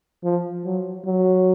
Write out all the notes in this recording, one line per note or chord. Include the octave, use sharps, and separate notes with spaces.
F3
F#3
F#3